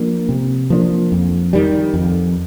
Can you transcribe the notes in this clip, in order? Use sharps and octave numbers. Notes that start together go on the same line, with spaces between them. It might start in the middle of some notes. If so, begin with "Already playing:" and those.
Already playing: F3 A#3 D4
C3
F3 A#3 D4
F2
D#3 G3
F2